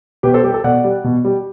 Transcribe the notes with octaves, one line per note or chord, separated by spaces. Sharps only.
B2 G4 B4
A4 C5
G3 G4
A4
B2 D5 F#5
G3
B2
G3